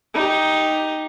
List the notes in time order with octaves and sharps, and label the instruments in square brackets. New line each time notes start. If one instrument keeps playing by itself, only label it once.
[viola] D#4 G4